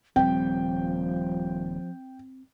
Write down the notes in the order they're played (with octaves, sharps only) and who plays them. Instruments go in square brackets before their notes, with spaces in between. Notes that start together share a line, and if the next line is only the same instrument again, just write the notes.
[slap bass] D#1 G3 [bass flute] F3 [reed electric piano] C4 [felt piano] G5